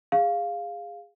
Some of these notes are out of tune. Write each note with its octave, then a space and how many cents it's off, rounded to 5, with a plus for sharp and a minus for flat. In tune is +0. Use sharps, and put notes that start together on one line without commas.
G#4 -20 F5 +0